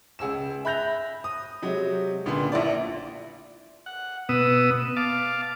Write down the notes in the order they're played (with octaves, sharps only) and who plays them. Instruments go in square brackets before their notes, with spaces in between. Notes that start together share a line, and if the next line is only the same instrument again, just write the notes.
[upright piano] C#2 G#4 E6 E7
E5 B5 F#6 G6 A#6 F7
D#6
C3 F#3 G#3
C#2 A#2 D3 B3 C6
A#1 E4 D5
[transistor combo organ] F#5
B2 B3 D#6 E6
F5 A5 D6